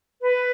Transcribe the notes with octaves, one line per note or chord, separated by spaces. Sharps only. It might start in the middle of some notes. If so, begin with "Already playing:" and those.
B4